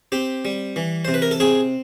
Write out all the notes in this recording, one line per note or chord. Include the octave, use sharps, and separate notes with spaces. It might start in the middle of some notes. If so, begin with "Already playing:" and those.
C4 G4
G3
E3
C3 C5
B4
A#4
A4
C4 G#4